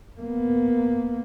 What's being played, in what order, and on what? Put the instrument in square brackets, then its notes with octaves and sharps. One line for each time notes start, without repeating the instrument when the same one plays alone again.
[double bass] A#3 B3